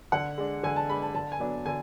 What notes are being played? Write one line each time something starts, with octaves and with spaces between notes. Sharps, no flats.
D3 F#5
G#3 D4
D3 G#5
A5
G#3 D4 B5
A5
D3 A5
G#5
F#3 B3 D4
D3 G#5